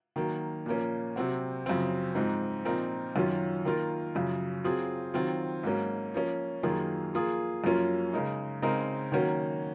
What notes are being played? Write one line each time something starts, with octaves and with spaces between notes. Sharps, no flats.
D#3 F#3 A#3
A#2 F3 A#3 C#4
C3 F#3 C4 F#4
F#2 C#3 F3 C4
G#2 F3 C4 D#4
A#2 F3 C4 D#4 A#4
F#2 D#3 F#3 C#4 F4
D#3 A#3 F4 A#4
F#2 C#3 F3
F#3 C4 F4 G#4
D#3 F#3 C4 F4
G#2 F#3 A#3 C#4
F3 A#3 C#4
F#2 D#3 A#3 F4 G#4
F3 A#3 F4 G#4
F#2 F3 A#3 C#4 F4
C#3 G#3 D#4 A#4
C#3 G#3 C4 D#4 A#4
D#3 F#3 A#3 C#4 F#4